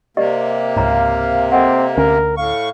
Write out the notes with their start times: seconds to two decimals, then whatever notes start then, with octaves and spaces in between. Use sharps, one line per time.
0.17 C3 A#3 G4 D5 D#5
0.76 C#2 G#2 C#5 F5 A#5
1.52 C4 A4 D#5 F#5
1.97 D2 C#4 A#4 G#5
2.37 A2 F5 C#6